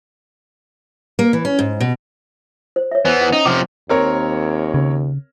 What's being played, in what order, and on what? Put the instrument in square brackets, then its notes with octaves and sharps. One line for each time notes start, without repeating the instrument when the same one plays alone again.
[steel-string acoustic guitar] A#3
E3
C#4
G#2
B2
[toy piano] C5
C#5 E5
[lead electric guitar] E3 B3 [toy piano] C5 G#5
[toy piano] F#5
[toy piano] C#4 [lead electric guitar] D#4
[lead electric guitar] C3 F3 [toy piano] F#5 G5 D6
[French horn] D#2 [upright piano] C4 A#4 C#5
[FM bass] C#3